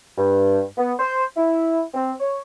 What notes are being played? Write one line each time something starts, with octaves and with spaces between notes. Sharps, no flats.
G2
B3
C5
E4
C4
C#5